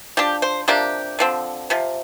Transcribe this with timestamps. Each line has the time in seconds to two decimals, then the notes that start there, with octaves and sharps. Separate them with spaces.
0.17 F3 D4 G4
0.42 C5
0.68 C3 F3 A#3 D4 G4
1.19 D3 F3 C4
1.70 C3 F3